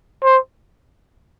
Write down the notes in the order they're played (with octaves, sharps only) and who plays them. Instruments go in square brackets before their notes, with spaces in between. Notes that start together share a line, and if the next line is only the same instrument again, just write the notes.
[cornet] C5